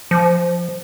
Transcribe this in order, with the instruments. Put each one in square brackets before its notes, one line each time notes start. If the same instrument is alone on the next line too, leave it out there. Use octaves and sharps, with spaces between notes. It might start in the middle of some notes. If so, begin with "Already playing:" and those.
[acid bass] F3